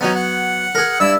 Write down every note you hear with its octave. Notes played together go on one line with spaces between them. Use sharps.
F#3 B3 C#4 D#4
F#5
G#4 A#4
G2 E4 E6